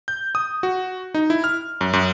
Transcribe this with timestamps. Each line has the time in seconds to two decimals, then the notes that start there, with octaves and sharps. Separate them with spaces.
0.08 G6
0.35 D#6
0.63 F#4
1.14 D#4
1.30 E4
1.44 F6
1.81 F#2
1.93 F#2